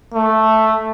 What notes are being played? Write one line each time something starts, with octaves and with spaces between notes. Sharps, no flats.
A3